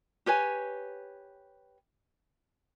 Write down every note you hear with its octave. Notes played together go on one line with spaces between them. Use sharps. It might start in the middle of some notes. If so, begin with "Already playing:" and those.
G4 B4 C#5 G#5